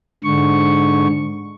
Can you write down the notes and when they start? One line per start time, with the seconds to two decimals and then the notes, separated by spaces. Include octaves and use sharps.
0.24 G#2 D3 C#6